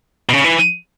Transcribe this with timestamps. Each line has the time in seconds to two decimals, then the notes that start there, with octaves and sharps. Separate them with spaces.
0.29 B2
0.33 C#3
0.44 E3